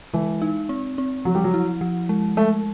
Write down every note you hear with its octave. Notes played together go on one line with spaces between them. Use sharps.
E3 G#3
D#4
C4
C4
F3 F#3
G3
F#3
E4
F3
G#3
G#3 A3